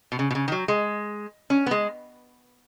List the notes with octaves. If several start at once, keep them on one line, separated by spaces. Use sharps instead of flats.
B2
C#3
B2
C#3
D#3
F#3
G#3
C#4
B3
G#3